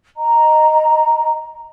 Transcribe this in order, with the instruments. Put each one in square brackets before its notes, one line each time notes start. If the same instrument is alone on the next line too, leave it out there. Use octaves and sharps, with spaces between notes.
[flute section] D#5 A#5